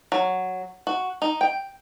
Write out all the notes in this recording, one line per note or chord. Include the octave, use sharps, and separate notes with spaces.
F#3
F#4
D#4
G5